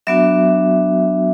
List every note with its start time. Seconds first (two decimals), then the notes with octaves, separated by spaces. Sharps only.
0.07 F#3 B3 D4 F#4 E5